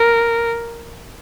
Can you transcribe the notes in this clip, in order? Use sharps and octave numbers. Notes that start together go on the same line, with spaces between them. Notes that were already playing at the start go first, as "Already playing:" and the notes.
Already playing: A#4